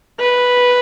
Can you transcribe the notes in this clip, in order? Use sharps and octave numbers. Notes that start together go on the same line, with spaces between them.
B4